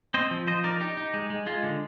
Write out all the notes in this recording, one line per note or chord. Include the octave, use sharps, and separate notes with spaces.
C4 C5 D#5
F3
F3 C5 D#5
D#4 A#4 D5
D#4 G4
D#4
G#3
G#3
G#3 F4
D3